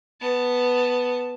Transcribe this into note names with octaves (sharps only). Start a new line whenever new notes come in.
B3 A5